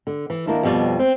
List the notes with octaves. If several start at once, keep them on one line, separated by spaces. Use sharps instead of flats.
D3
E3
D#3 A#3 D4 E4
F2 B2 G3 D5
C4